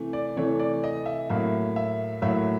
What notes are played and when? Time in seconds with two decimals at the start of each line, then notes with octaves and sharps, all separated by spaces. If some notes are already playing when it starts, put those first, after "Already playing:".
Already playing: C3 E3 A3
0.13 D5
0.36 C3 E3 A3 C#5
0.59 D5
0.84 D#5
1.06 E5
1.29 A2 F#3 A#3 E5
1.76 E5
2.22 A2 F#3 A#3 E5